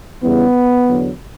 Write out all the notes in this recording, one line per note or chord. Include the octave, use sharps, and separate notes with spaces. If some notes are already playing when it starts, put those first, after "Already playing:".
E2 C#3 E3 G3 B3
E2 D3 F#3